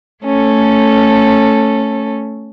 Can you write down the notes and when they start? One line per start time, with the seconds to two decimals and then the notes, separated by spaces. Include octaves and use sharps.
0.22 A3 C#4 A4